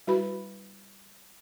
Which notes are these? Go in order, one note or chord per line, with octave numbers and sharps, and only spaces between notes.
G3 E4 F#4 B4 B5